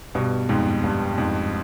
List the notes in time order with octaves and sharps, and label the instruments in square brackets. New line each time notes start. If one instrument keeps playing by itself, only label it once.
[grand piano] G2 B2
F2 G#2
G2
F2 G#2